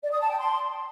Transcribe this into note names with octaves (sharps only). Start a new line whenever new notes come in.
D5
D#6
A5
G5
C6